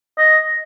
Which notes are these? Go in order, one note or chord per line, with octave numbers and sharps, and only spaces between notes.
D#5